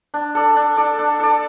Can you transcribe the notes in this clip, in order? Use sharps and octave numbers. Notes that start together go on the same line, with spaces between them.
D4
A4 D5
D4
A4 D5
D4
A4 D5